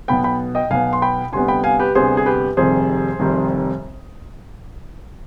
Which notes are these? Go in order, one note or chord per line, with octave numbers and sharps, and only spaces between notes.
B1 B2 B3 G5 B5
G5 B5
D#5 G5
B1 B2 B3 F5 G#5
C6
G5 B5
D2 C3 G3 B3 G#5 C6
G5 B5
F5 G#5
G4 B4
D2 C3 G3 B3 G#4 C5
G#4
G4 B4
F1 F2 C3 D#3 G3 G#4 C5
F1 F2 C3 D#3 G3